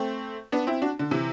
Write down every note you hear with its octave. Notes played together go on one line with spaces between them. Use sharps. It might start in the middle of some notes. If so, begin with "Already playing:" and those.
Already playing: A3 C4
B3 D4
C4 E4
D4 F#4
D3
C3 E3